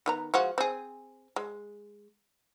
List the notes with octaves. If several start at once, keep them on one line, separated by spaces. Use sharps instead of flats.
D#3 B3 A#5
F3 G#3 F#4
C4 G#4
G#3